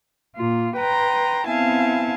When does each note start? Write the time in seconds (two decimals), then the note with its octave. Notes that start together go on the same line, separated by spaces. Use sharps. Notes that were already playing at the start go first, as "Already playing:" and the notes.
0.36 A#2 F4
0.76 B4 G5 A#5 C6
1.48 B3 C4 E4 F5 G#5 A5